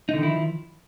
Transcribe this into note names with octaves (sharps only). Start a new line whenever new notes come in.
D3 D#3 F3 D#4 E4